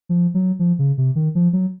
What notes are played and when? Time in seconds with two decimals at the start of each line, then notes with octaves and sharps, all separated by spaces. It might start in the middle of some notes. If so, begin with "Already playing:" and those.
0.09 F3
0.34 F#3
0.59 F3
0.79 C#3
0.98 C3
1.16 D#3
1.35 F3
1.53 F#3